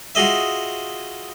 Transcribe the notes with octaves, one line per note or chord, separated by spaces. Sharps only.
F4 F#4 G#4 D#5 E5